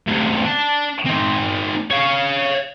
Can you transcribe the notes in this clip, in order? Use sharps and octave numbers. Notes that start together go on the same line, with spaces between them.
D2 C3
D4 A5
C4 D#4
C#5 F5